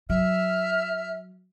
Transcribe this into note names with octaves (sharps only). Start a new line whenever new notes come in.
F#3 E5 F6